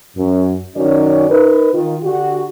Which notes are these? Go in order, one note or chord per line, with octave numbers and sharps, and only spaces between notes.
F#2
F#2 D#3 C#4 F#4 C#5 D5
D#4 A#4 B4
D#3 F4
D3 F#4 G4